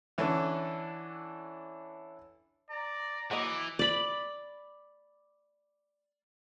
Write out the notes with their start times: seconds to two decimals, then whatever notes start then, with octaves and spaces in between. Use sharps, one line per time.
0.18 D3 E3 C#4 D4 A4
2.70 D5 A#5
3.31 E3 F#3 A#3 D#5 D6
3.79 D5 B5